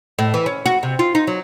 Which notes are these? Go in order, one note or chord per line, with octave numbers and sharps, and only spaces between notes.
A2
E3
C#4
F#4
C3
F4
D#4
F#3